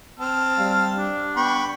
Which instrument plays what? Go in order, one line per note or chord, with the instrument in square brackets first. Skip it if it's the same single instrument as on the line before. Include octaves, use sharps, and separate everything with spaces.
[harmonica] C4 A5 F6
[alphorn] G3 [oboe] F5
[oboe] D4
[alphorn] B3 [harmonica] G5 B5 C#6